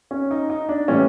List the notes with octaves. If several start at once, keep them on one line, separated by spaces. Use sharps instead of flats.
C#4
D#4
D#4
D4
A2 E3 G3 C#4